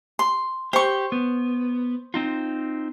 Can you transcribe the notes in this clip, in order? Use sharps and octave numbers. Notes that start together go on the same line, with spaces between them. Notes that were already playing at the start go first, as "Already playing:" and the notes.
C6
G4 C5 C#6
B3
C4 D#4 F4